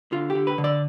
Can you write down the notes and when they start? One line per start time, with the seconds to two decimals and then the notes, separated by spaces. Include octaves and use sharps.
0.12 D3 F4
0.30 G4
0.35 D3
0.47 B4
0.58 D3
0.64 D5